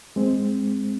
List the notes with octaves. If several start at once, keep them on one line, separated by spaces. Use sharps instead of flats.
G#3 C4